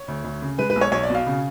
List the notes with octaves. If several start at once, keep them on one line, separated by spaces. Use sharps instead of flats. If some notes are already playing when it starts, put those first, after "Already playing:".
Already playing: C#5
D2
D2
C#3
G#3 B4
B4
B1
C#5
B1 C#5
D5
B2
F5
C#3